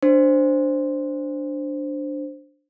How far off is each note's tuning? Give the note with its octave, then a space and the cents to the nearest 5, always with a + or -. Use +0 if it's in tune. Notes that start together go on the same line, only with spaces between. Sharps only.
D4 +0 C5 +0